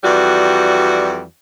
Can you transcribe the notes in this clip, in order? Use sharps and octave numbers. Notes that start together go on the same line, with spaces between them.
F2 E3 G3 F#4 D5